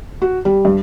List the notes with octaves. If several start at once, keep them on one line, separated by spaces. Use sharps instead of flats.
F#4
G3
G2